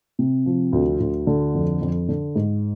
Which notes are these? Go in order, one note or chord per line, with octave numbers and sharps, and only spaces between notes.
C3
F3
D2
D2
D3
F2
F2
D3
G#2